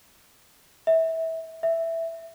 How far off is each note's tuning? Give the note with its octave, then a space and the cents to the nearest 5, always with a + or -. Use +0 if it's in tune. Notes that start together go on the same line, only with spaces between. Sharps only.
E5 -20
E5 +5